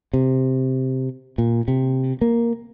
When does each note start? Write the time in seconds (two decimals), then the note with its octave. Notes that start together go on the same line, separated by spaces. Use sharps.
0.13 C3
1.38 A#2
1.68 C3
2.21 A#3